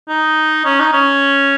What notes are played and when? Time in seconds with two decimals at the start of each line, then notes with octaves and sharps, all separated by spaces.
0.09 D#4
0.65 C#4
0.80 D#4
0.93 C#4